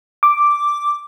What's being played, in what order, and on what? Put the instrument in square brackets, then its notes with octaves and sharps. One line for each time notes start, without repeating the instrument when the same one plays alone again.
[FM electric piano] D6